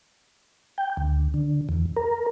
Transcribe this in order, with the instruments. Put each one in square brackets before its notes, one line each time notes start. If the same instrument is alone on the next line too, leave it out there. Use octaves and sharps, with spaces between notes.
[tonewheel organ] G5
D2
D3
E2
A#4